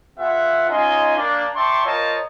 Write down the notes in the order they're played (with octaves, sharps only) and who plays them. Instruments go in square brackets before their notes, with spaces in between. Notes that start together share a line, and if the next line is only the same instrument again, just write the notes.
[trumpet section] B3 F4 G#4 E5 F#5
C#4 D#4 F4 D#5 G#5 C6
A#3 D4
D5 E5 G5 A5 C6 C#6
F4 A#4 C5 C#5 D#5 A5